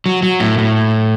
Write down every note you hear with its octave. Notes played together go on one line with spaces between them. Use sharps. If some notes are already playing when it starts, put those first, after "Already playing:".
F#3
F#3
A2
A2